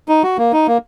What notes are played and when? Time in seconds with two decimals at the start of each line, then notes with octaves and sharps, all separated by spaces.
0.09 D#4
0.23 F#4
0.38 A#3
0.53 D#4
0.67 A#3